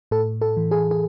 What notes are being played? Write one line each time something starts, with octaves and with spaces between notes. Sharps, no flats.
A2 A4
A4
E3
G#4
G#4